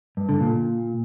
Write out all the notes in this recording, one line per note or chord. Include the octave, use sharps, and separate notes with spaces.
G2
D3
A#2